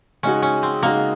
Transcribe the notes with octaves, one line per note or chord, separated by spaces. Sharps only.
C#3 G#3 C#4 D#4 F#4
C#4
C4
C#3 G#3 A#3 D#4 F#4